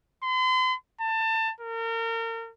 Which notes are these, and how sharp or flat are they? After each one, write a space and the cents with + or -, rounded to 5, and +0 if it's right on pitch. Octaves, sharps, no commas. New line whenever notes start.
C6 -40
A5 +25
A#4 -35